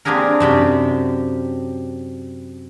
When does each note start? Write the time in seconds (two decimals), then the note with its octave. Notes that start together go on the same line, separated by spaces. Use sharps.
0.05 A#3 C4 D4 G4 G#4 A#4
0.40 F#2 C3 G4 G5